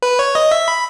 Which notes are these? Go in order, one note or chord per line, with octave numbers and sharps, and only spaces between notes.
B4
C#5
D#5
E5
B5